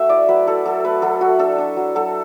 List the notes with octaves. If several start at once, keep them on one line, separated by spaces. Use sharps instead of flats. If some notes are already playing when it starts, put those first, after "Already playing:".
Already playing: A3 F#4 E5
E4 D5
F#3 B4
E4 A4
F#3 A4
A3 B4
F#3 A4
A3 F#4
D4 A4
D4
F#3
F#3 A4